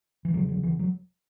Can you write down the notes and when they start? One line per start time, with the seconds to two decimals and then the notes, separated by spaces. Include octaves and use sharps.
0.25 E3
0.34 E2 F#3
0.37 C#3
0.49 F#3
0.63 E3
0.79 F#3